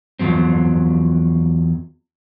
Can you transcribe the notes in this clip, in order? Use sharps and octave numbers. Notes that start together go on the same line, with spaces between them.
E2 B2 F3 F#3 C4